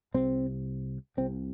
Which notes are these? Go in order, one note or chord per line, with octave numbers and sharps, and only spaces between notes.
C2 C3 C4
C2 C3 C4